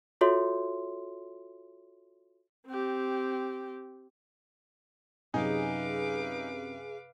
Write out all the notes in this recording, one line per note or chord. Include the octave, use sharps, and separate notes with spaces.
F4 F#4 A4 C#5 E5 C6
C4 G4
F#2 C3 D#4 G#4 B4 F5 D6